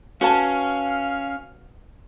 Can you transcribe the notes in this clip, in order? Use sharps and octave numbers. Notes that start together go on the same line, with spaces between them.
C#4 F#4 B4 F5 A5